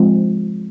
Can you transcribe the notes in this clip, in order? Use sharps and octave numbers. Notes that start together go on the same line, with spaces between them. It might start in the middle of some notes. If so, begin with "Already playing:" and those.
Already playing: F3 G#3 C4